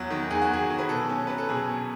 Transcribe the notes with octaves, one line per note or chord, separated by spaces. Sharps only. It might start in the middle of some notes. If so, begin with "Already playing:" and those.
Already playing: E2 F#3 F#4
D#3
E2 G#4
F#4
E2 G#4
F#3
B4
B2 A4
C#4
F#3 B4
A4
B2 G#4
B2